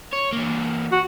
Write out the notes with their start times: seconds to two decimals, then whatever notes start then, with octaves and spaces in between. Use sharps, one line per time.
0.13 C#5
0.33 E3 A#3
0.92 F#4